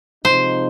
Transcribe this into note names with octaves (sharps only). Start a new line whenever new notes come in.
C3 F3 G#3 D#4 C5